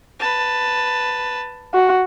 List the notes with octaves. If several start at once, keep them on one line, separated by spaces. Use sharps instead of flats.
B4 A5
F#4